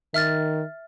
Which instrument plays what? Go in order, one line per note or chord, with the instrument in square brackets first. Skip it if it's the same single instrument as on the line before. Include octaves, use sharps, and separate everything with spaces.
[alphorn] D#3 [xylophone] E5 F6 A6